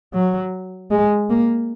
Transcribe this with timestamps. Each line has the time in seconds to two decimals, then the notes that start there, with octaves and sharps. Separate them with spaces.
0.14 F#3
0.92 G#3
1.30 A#3